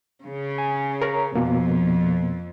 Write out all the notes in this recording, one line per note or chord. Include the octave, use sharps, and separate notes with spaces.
C#3
G#5
A#4 C#5 A#5
F2 B2 A#3